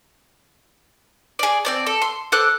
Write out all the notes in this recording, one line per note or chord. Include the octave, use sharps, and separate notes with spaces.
G#4 D5
C4 D5 A5
A4
C6
A4 C5 D6 F#6